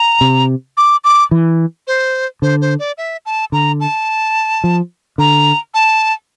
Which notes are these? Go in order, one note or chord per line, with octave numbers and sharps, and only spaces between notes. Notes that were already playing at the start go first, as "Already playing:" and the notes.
Already playing: A#5
C3
D6
D6
E3
C5
D3 C5
C5
D5
E5
A5
D3 A#5
A5
F3
D3 A#5
A5